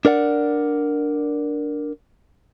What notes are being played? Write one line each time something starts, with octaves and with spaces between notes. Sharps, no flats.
D4 A#4 D5 F#5